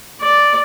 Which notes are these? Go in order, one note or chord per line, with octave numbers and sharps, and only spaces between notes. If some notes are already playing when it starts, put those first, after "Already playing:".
D5